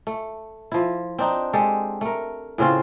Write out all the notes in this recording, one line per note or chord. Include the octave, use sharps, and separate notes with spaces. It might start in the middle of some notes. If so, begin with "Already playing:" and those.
A3
F3 E4
C4 D4 D#4
G#3 G4 A4
A3 A#4
A2 C#3 C4 F4